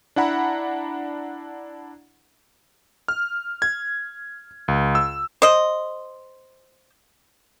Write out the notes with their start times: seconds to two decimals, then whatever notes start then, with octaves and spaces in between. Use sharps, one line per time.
0.16 D4 E4 F#5 A#5 B5
3.08 F6
3.62 G#6
4.68 C#2
4.95 E6
5.42 C5 D#5